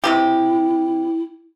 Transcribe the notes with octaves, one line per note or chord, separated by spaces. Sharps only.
C3 F3 E4 G4